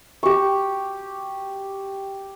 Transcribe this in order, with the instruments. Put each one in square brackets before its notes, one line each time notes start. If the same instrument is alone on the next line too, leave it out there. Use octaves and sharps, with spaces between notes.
[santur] G4 C#6